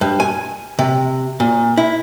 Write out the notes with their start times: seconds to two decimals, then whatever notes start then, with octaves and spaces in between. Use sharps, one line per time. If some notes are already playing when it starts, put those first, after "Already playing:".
0.01 G2
0.20 G#5
0.79 C3
1.40 A#2
1.77 E4